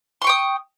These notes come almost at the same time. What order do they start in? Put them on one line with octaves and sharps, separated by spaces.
C6 C#6 G5 D#6